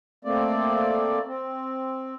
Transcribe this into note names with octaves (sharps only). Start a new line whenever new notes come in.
A3 A#3 C4 D5
C4